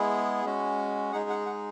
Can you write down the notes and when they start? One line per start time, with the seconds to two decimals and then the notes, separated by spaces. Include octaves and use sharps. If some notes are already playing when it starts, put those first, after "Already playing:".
Already playing: G#3 B3 E4 G#4
0.45 G#3 C#4 F#4
1.12 G#3 D#4 G#4 F#5
1.30 F#5
1.46 F#5